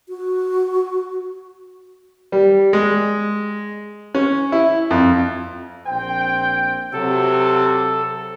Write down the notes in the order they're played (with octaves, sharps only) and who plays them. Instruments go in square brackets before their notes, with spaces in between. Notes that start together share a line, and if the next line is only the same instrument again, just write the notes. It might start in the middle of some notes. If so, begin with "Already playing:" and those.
[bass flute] F#4
[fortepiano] G3
G#3
C#4
E4
F2
[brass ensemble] A#1 C4 G5
[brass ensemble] C3 F#3 [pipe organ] A4